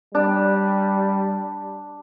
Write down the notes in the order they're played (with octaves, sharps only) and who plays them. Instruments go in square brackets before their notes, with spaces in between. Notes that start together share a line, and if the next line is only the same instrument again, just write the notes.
[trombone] G3 [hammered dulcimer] D4